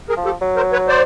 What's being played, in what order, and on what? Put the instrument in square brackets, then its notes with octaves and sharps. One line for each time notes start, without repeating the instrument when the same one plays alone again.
[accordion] G#4 A#4
[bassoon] F3
[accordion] G4 A4
[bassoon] F#3
[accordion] A#4 C5
B4 C#5
C5 D5